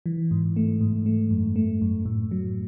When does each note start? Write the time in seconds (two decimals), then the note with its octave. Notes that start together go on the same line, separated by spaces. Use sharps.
0.06 E3
0.31 G#2
0.56 A3
0.81 G#2
1.06 A3
1.31 F#2
1.56 A3
1.81 F#2
2.06 A2
2.31 F#3